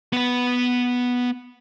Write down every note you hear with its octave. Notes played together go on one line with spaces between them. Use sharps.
B3 B4